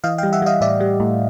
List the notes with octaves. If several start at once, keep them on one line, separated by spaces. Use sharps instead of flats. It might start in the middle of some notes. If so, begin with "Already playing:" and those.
E3 D#5 F5
G3 F5 G5
E5 F#5
G3 D#5 F5
A2 D5 E5
G3
A2